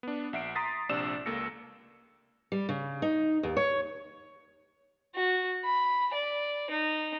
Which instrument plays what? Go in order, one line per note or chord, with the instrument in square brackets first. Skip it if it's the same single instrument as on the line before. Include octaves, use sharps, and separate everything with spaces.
[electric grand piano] B3 D4
A#1 E5 F#5 C7 D7
A#5 C6 D#6 A6 B6 C7
A#1 C3 D4 D5 E6 E7
C#2 A#3 A4 E6 A#6 C#7
[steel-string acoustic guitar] G3
C#3
D#4
D#2
C#5
[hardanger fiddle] F#4
B5
D5
D#4